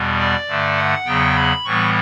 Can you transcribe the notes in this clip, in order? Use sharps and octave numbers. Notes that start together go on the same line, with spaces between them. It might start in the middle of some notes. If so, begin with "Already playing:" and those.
Already playing: E2 B2 G3 B3
D5
G2 D3 A3
F#5
E2 C#3 F#3 B3 G5
B5
A2 E3 G3 B3 C#6